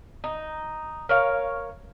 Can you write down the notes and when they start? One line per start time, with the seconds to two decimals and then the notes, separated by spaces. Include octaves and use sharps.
0.24 D#4
1.09 A#4 C#5 F5